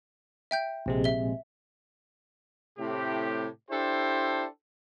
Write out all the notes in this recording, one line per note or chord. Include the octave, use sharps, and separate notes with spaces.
E5 G5 G6
A#1 C3 G#3
E5 G7
A2 C3 G4
D4 E4 G4 A4 C5